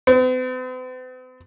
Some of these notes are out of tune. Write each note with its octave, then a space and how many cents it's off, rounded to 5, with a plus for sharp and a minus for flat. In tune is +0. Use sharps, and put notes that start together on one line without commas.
C4 -45